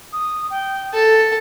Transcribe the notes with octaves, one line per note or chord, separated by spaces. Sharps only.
D#6
G5
A4 A6